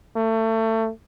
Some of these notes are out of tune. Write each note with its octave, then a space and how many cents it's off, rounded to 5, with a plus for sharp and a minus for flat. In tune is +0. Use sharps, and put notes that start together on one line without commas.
A3 +25